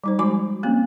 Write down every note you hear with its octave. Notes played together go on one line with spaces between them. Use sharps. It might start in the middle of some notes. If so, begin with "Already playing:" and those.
G3 D#4 C5
F3 G#3 F#4 G#5 D6
A#3 C4 C#4